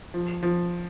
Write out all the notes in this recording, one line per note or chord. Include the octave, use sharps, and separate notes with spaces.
F3
F3